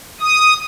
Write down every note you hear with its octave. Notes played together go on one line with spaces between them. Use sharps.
D#6